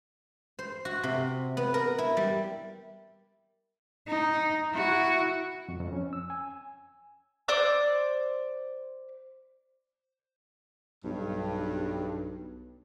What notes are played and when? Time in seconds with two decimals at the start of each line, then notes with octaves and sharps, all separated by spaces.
0.59 C5
0.85 F#4
1.03 C3
1.57 B3
1.74 A#4
1.98 E4
2.17 G3
4.08 D#4
4.73 E4 F#4
5.68 F2
5.80 F2
5.93 C#4
6.13 E6
6.30 G#5
7.48 C5 D5 D6 E6
11.04 B1 G2